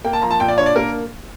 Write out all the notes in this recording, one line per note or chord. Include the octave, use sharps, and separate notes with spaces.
A#3 G5
A5
F3 A#5
A5
A#2 G5
D5
D4 C#5
D5
A#3 A#4